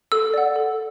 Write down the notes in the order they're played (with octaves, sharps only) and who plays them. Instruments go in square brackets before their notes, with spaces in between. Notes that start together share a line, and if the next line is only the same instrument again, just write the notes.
[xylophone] A4 E6
D5 F#5
A4